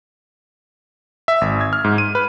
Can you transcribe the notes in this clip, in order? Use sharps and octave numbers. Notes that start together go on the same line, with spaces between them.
E5
G#1
G#6
F6
G#2
D#7
B4